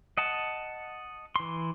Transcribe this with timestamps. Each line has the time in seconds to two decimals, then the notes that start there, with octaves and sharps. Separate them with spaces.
0.17 D#5 F#5 A5
1.36 E3 C6